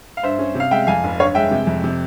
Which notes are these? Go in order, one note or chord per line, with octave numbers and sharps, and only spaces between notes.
F5
G2 C5 E5
C#4
C3 F5
G#3 E5 G5
F2 F5 G#5
F1
G2 C#5 F5
G#3 E5 G5
C3
F2
C3